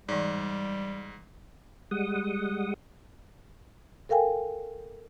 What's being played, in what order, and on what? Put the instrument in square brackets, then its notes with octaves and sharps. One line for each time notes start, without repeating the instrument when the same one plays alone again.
[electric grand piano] G#2 [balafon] E3 D5 [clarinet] G3
[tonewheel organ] G3 G#3 F#5 D#6
[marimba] A4 A#4 F5 G5 G#5